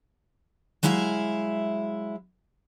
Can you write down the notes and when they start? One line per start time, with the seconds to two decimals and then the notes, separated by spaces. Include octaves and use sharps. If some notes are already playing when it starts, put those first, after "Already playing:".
0.83 F#3 G#3 E4 E5 F5